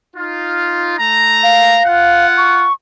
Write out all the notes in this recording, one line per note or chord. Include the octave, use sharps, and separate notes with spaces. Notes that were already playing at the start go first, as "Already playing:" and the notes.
D#4 F4
A3 A#5
F5
F4 F#5
C#6